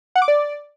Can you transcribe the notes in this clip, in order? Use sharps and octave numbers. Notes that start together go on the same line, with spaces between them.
F#5
D6
D5